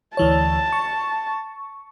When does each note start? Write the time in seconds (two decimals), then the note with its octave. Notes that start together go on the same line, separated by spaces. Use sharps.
0.17 D2 E3 C#5 A5
0.73 C#6